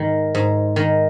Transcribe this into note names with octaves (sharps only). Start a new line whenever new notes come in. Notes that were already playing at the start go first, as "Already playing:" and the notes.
Already playing: G#2 D#3
G#2
D#3